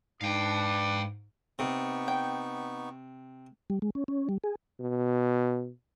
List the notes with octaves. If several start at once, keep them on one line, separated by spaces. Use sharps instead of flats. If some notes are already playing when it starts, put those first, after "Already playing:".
G#2 D4 B4 F5 G5 D6
C3 B3 D#4 C#6
G5
G3
G#3
C#4
C#4
G3
G#4
B2